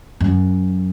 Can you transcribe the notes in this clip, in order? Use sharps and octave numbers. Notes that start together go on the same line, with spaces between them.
F#2